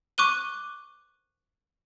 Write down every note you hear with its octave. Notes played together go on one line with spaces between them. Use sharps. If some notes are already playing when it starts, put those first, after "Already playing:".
C#6 D6 F#6 D#7 G7